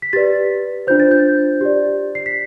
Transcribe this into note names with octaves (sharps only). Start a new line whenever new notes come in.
B6
G4 B4 D5 A6
D4 F4 C5 G6
A6
G6
G4 D5
C7
B6